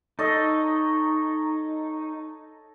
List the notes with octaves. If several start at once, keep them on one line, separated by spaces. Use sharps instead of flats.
D#4 A4 C#5 D#5